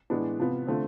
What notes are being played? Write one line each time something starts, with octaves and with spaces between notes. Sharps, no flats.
A2 E3 G#3 B3 D4
C3 F3 B3
D3 F3 A3 C4